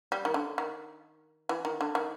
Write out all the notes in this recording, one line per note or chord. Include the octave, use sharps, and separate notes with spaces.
G3
D#3
D3
D#3
E3
D#3
D3
D#3